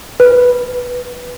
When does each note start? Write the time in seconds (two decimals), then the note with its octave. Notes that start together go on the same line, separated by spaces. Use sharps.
0.20 B4